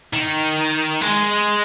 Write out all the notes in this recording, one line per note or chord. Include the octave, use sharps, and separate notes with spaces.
D#3
G#3